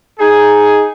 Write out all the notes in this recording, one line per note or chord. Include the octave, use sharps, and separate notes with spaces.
D#4 G#4